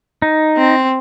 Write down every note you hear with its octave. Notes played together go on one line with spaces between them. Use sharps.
D#4
C4